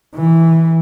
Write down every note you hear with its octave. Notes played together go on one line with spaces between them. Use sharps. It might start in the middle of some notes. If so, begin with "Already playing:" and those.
E3